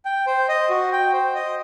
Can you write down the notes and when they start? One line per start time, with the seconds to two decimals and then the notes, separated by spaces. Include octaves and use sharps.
0.05 G5
0.27 C5
0.49 D#5
0.70 F#4
0.92 G5
1.13 C5
1.35 D#5